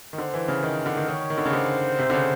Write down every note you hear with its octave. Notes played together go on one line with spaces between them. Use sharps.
D#3
D3 C5
E3
C#3
D#3
D3
D#3
D#3 C#5
D#3
D3
C#3
D3 C5
C3
D3
C#3